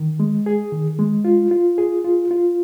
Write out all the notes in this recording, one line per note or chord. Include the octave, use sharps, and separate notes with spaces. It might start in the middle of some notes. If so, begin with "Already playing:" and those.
Already playing: D#3
G#3
G#4
D#3
G#3
F4
F4
G#4
F4
F4